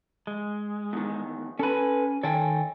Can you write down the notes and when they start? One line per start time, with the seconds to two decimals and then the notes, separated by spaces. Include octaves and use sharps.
0.27 G#3
0.93 E2 D#3
1.59 C#4 A4 B4 G#5
2.23 D#3 A4 C#5 G5 G#5